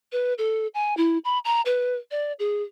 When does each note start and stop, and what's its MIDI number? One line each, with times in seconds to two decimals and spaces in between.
0.12 0.34 71
0.38 0.67 69
0.74 0.96 80
0.97 1.18 64
1.24 1.39 83
1.45 1.61 82
1.65 1.95 71
2.11 2.33 74
2.39 2.63 68